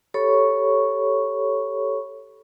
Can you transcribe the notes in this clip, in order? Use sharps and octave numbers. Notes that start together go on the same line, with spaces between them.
G4 A4 C#5 B5 C#6